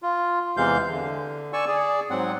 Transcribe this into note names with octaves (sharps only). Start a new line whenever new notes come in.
F4
E2 C3 E3 G#3 F5 G6
D3
D5 G#5 C#6 E6
G#4 D5
G#2 F#3 C4 F#5